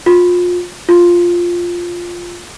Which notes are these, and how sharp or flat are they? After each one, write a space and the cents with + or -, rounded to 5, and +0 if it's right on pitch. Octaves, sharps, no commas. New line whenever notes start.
F4 +30
F4 +0